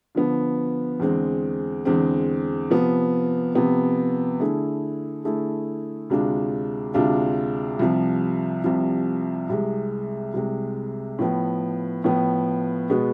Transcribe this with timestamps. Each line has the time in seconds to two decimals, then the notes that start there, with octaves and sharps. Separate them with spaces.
0.15 D3 F3 B3
1.00 E2 D3 G#3 C4
1.85 E2 D3 G#3 C4
2.70 C3 F3 B3
3.55 C3 F3 B3
4.40 D3 A3 E4 G#4
5.24 D3 A3 E4 G#4
6.10 D2 C3 G#3 D4 F4
6.94 D2 C3 G#3 D4 F4
7.79 C2 C3 F3
8.64 C2 C3 F3
9.49 C2 C3 G#3
10.34 C2 C3 G#3
11.19 A2 F3 B3
12.04 A2 F3 B3
12.90 B2 G#3 B3